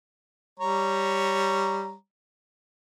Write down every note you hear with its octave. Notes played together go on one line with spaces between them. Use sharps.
G3 C#5 A#5